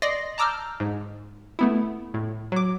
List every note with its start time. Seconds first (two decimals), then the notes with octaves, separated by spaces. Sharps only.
0.02 D5 D#5 C6 A#6 C7
0.38 A5 A#5 D6 E6 F6 G6
0.80 G#2
1.59 A3 B3 E4
2.14 A2
2.52 F#3 D6